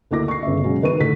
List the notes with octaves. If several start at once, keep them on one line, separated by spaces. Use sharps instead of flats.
D2 A#3 E4 D6 A#6
C#6 C7
G1 C#3 E5
B2 F#3 G#3 C#4
D#3 B4 C#6 D#7
A2 D3 B6